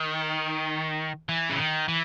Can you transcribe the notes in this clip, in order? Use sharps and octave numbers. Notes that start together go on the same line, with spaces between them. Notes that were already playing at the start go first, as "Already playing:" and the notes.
Already playing: D#3
E3
C#3
D#3
E3